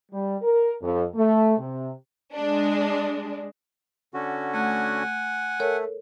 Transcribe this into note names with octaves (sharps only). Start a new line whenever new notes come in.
G3
A#4
F2
A3
C3
G#3 D4
D3 C#4 F#4
A3 F#5 G#5
A3 A4 A#4 C#5